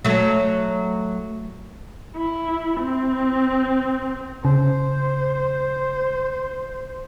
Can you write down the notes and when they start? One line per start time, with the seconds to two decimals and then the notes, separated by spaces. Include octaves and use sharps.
0.05 F#3 A3
2.16 E4
2.81 C4
4.45 C#3 C5